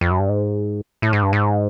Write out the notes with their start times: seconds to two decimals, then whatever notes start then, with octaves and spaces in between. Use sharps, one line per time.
0.01 F2
0.11 F#2
0.20 G2
0.29 G#2
1.02 A2
1.13 G#2
1.23 G2
1.33 G#2